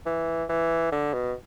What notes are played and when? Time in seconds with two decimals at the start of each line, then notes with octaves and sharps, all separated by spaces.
0.06 E3
0.49 E3
0.92 D3
1.14 B2